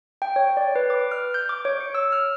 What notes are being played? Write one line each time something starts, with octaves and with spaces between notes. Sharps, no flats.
G5
C#5
D5
B4
D6
F6
G6
D6
C#5
C#7
E6
F6